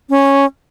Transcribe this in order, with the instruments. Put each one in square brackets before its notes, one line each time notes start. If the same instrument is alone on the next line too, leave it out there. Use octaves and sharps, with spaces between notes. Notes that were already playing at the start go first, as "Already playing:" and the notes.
[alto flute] C#4